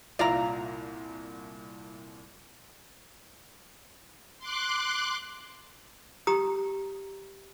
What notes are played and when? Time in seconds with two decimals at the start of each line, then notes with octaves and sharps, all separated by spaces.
0.19 C2 A#2 E4 F4 D5 F5 A#5
4.38 C6 D6 F#6
6.27 G4 A#5 D#6